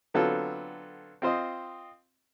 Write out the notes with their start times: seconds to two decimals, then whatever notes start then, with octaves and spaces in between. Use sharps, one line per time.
0.14 D3 F#3 B3 C4 F4 A4
1.22 C4 F4 C5 D#5